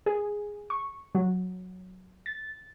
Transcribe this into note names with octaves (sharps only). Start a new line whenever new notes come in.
G#4
C#6
F#3
A6